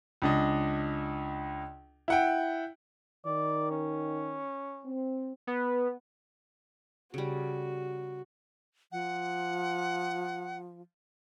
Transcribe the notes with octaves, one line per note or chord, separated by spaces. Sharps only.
C#2 D4 D#5
E4 F#5 G5
D#3 D5
C#4
C4
B3
C#3 G3 F#4
F3 F#5